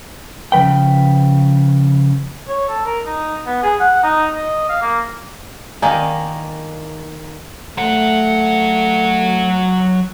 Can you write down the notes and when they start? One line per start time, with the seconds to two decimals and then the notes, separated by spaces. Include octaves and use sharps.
0.52 C#3 F3 B4 G5
2.48 C#5
2.68 A4
2.85 A#4
3.06 D#4
3.46 B3
3.63 G#4
3.80 F#5
4.03 D#4
4.36 D#5
4.70 F5
4.82 A#3
5.82 D#3 A#3 D#4 D5 G#5
7.78 F#3 A3 F#5